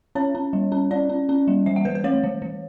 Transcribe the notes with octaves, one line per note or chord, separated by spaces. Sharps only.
C#4 C#5
C#4
G3
C#4
C#4 D5
C#4
C#4
G3
E3 E5
F#5
E3 B4
B4
A3 C#5
E3
E3